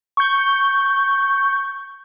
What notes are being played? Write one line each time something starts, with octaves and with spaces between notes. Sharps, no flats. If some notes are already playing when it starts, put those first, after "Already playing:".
C#6 G6